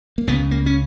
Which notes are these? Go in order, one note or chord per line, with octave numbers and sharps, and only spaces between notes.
A#3
C#2 C#3 B3
A#3
C#4